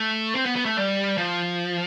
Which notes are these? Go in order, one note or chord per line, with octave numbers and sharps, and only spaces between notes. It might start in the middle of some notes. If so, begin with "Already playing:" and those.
Already playing: A3
C4
B3
B3
A3
G3
F3